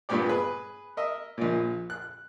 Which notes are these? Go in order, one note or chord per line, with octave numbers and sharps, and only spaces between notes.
G2 A#2 B3 G4 D5
G#4 B4
A#4 D#5 E5
A#1 A#2
F#6